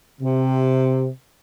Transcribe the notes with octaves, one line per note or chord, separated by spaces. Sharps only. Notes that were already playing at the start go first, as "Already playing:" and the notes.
C3